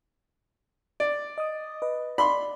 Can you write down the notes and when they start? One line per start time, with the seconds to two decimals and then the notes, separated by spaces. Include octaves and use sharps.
1.00 D5
1.38 D#5 D#6
1.82 B4 D#5
2.18 D5 B5 C6